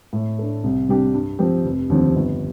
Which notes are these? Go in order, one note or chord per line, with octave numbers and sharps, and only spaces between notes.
A2
A3 D4
C2
C3 G3 D4 G4
G2
F3 C4 G4
F1
D#2 D3 F3 C4
G1